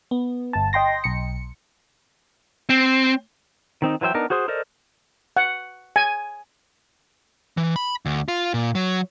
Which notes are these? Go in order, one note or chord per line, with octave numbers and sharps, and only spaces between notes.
B3
G1 A5
D#5 G5 C6 A#6
B1 C#7
C4
D#3 C4 D#4
E3 F#3 C5 E5 G5
B3 D4 D#4 A#4
F#4 G#4 C5 C6 D#6
A4 A#4 C5 D5 D#5
F#5
G#5
E3
B5
D2
F4
A#2
F#3